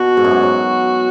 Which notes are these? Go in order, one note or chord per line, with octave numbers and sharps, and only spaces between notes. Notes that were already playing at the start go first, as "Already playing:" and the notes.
Already playing: B2 F#4
G#2
F#2
G#2
F#3